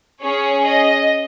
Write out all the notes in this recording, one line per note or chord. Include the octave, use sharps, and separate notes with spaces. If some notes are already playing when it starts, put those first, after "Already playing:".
C#4 G#4 C#5
D#5